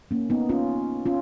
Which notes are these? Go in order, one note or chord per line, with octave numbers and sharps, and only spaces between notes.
A#3 C#4
B3 D#4
C#4 F4
C#4 F4